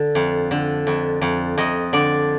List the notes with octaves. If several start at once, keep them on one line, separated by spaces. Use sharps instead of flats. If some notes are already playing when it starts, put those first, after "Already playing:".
Already playing: D3
F2
D3
F2
F2
F2 D#5
D3 D5